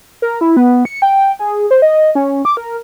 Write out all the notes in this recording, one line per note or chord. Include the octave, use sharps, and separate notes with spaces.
A#4
E4
B3
C#7
G5
G#4
C5
D#5
C#4
D6
A#4